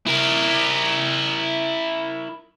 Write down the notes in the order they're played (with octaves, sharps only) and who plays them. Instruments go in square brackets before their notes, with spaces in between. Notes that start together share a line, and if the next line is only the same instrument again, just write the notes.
[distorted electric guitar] E4 A#4